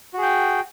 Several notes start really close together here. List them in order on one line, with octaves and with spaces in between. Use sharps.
F#4 G#4 G5